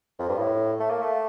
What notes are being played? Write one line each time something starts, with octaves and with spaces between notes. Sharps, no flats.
F2
G2
A2
A3
A#3
A3